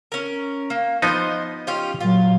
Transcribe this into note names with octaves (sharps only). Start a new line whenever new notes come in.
C#4 A#4
A#3
F3 B3 D#4 C5 D#5
C#4 F4 G4
A#2 F#3 F4